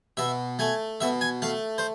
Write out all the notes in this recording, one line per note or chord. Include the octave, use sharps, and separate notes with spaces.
B2 E5
A3 G#5
B2 E5
G#5
A3 F5
C5